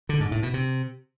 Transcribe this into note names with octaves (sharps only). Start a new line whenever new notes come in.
D3
G#2
A2
B2
C3